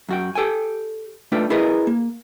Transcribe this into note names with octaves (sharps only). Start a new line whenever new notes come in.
F#2 F#4 G5
G4 A4 G5 G#5
A3 D4 F4 B4 G5
E4 G#4 A#4 B4 D#5
A#3